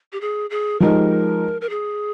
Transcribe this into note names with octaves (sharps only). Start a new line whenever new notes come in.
G4
G#4
G#4
F3 G#3 D#4 G4 A#4
A#4
G#4